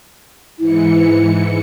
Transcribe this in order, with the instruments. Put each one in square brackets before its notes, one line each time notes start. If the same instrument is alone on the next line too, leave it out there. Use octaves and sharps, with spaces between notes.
[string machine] G#2 E3 C#7 [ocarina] E4